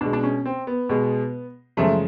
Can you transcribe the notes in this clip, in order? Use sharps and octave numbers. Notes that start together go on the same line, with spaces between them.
B2 G#3 D4
D4
C#4
C4
B3
B2 G#3
F#2 C#3 F3 G#3 A3